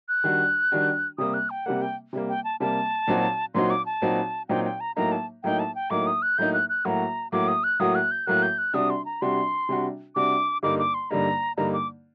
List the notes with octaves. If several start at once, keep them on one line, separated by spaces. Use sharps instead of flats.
F#6
D#3 G3 D4 F#4
D#3 G3 D4 F#4
C3 G3 A#3 D#6
F#6
G5
C3 G3 A#3 F#5
G5
C3 G3 A#3
G5
A5
C3 G3 A#3 A5
A#2 F#3 C4 D#4 F#4
A#2 F#3 C4 D#4 F#4 C6
D6
A5
A#2 F#3 C4 D#4 F#4
A#2 F#3 C4 D#4 F#4 G5
G5
A#5
A2 F#3 A#3 D#4 A#5
A5
A2 F#3 A#3 D#4 G5
A5
G5
A2 F#3 A#3 D#4 D6
D#6
F#6
A2 F#3 A#3 D#4 G6
F#6
F#6
A2 F#3 A#3 F#4 A#5
A2 F#3 A#3 F#4 D6
D#6
F#6
A2 F#3 A#3 F#4 D#6
F#6
G6
A2 F#3 A#3 F#4 F#6
G6
F#6
C3 G3 D4 F#4 D#6
C6
A#5
C3 G3 D4 F#4 C6
C3 G3 D4 F#4
C3 G3 D4 F#4 D6
G2 D3 G3 A#3 D#4 D6
D6
C6
G2 D3 G3 A#3 D#4 A#5
G2 D3 G3 A#3 D#4 A#5
D6